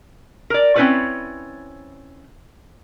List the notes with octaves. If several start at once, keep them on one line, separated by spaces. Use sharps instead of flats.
A#4 D5
C4 C#4 E4 B4 C#5 D5